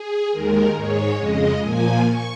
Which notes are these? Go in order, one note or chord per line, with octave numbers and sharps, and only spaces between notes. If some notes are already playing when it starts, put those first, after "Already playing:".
Already playing: G#4
D#2 D#3 G#3 A#4
G#2 G#3 C#5
F2 C#3 G#3 D#5
A#2 F3 A#3 G#5
C#6